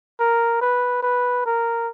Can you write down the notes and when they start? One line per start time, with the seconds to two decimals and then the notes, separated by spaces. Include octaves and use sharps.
0.20 A#4
0.62 B4
1.03 B4
1.46 A#4